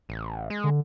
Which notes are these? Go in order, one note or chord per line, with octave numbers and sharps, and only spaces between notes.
A1
G#3
D3